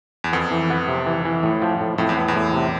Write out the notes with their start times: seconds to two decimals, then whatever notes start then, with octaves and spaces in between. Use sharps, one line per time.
0.24 E2
0.33 F2 B3
0.51 E3
0.70 B3
0.88 C3
1.06 E3
1.25 E3
1.43 A2
1.62 F3
1.81 A2
1.98 F2 A2
2.09 E2
2.18 B3
2.28 E2
2.36 A2
2.53 C3